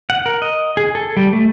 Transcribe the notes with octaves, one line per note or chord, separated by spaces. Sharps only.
F#5
A#4
D#5
G#4
A4
G3
A3